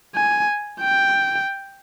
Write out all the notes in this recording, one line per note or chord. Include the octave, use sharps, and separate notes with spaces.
G#5
G5